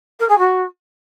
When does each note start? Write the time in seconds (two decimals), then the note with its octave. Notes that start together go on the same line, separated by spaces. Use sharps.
0.19 A#4
0.29 G#4
0.38 F#4